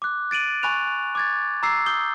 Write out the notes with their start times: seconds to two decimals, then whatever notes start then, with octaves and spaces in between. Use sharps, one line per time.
0.02 D6 F#6
0.31 A6 D7 D#7 F#7
0.63 G#5 B5 C#6 F#6 F7
1.15 D6 G#6 A6
1.63 A#5 D6 E6 C7
1.86 D#6 G6 G7